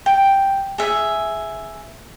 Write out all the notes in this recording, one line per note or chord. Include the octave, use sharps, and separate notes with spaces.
G5
G#4 E5